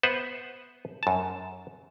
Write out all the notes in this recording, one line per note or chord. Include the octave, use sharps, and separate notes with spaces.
B3 B4 C5 E5 F#5
F#2 A5